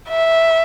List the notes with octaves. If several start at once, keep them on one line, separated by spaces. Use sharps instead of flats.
E5